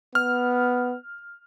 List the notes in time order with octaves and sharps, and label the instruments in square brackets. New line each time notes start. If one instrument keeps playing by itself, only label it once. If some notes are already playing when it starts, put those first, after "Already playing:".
[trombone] B3 [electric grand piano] F6